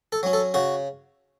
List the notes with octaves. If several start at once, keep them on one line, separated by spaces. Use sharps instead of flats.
A4
F#3 C#4
A4
C#3 F#4